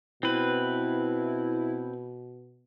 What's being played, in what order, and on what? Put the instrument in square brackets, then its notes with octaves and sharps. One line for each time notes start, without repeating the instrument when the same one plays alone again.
[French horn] B2 [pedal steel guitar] C4 B4 [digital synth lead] E4